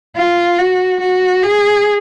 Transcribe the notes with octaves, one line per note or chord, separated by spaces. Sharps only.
F4
F#4
F#4
G#4